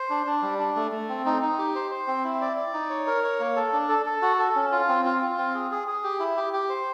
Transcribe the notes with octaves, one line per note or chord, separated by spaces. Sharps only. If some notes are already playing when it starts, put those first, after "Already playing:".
Already playing: C5
D4
D4
G3
D4
A3
A3
C4
D#4
D#4
G4
C5
C5
C4
E4
D5
D5
D#4
C#5
A#4
C#5
A#3
A4
D4
A4
A4
F#4
A4
C#4
F4
C4
F4
F4
C4
G#4
G#4
G#4
G4
E4
G4
G4
C5